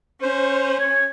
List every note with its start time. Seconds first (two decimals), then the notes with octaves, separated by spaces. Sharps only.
0.22 C#4 C5
0.77 C#5